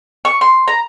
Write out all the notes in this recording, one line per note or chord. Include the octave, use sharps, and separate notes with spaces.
C#6
C6
A#5